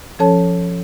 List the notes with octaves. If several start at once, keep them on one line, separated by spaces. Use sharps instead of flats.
F3 C#4 A4 C#5 A5